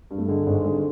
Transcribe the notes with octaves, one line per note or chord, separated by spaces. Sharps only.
G2
A3
D3 G#3
G#1 G#3
D3 G#3